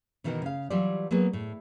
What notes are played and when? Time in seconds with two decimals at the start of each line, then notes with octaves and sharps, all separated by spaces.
0.24 B2 D#3 E3 D#4 F#4 A#4
0.42 C#3 F5
0.70 E3 F#3 G3 F4 G4 D5
1.11 F#3 A#3 B3 G#4
1.33 A2